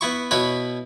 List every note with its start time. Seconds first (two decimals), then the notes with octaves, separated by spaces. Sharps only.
0.01 B3 E4 C#6
0.31 B2 E4 B4 C#5